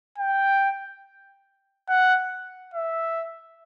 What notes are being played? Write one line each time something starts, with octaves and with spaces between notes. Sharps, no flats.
G5
F#5
E5